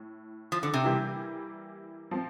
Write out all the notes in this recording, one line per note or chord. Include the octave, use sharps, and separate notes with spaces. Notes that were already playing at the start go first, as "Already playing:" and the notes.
Already playing: A2
F3
D3
C3
E3 G3 A#3 E4 G4
F3 C4